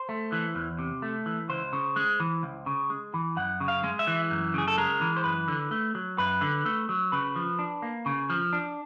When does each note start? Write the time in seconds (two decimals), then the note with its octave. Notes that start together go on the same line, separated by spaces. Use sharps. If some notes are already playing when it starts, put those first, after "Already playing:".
Already playing: C5
0.09 A3
0.32 E3
0.55 E2
0.79 C3
1.02 A3
1.26 E3
1.49 C#2 C5
1.73 C#3
1.96 G#3
2.20 E3
2.43 C#2
2.66 C#3
2.90 G#3
3.14 E3
3.36 F#2 F#5
3.60 C#3
3.68 F5
3.84 G#3
3.99 E5
4.07 E3
4.30 F#2
4.54 C#3 G#4
4.68 A4
4.78 G#3 A#4
5.01 E3
5.17 C5
5.24 F#2 B4
5.48 D3
5.71 A3
5.95 F#3
6.18 F#2 B4
6.41 D3
6.66 A3
6.89 F#3
7.12 C#3 B4
7.36 F3
7.59 D4
7.82 A#3
8.06 C#3
8.30 F3
8.53 D4